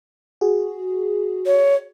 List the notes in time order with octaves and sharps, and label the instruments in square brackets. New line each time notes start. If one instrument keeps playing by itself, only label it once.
[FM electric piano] F#4 G#4
[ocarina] C#5